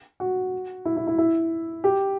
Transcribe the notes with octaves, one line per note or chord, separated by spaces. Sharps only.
F#4
E4
E4
E4
E4
G4